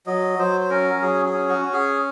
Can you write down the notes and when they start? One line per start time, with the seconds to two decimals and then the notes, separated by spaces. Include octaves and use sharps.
0.07 F#3 D#5
0.39 F#3 C5
0.60 C5
0.70 C#4 A#4
1.02 F#3 G#4
1.26 G#4
1.33 C#4
1.49 F#4
1.65 C#4
1.73 G#4